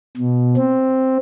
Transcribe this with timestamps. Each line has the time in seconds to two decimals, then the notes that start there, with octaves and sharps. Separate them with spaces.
0.17 B2
0.56 C4